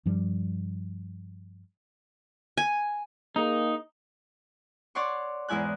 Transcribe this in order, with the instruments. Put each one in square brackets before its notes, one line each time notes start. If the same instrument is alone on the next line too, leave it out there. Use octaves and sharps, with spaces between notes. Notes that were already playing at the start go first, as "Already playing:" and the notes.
[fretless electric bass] G2 F3 G3
[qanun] G#5
[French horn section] A#3 G#4 [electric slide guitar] D#4
[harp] C#5 D5 F#5 C6 C#6
E2 G#2 E4 G#5 F#6